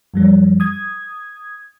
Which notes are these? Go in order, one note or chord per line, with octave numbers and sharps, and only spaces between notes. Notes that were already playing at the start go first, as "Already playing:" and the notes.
F#2 F3 G3
D#6 G#6